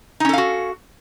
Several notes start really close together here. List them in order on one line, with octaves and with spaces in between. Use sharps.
D#4 C#4 A4 F5 F#4